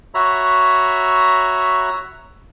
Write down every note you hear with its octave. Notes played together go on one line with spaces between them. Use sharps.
F#4 C#5 E5 A#5 B5